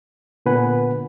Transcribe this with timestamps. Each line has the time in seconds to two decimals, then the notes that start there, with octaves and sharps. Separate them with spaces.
0.46 A#2 D3 B3 B4 F#5 G#5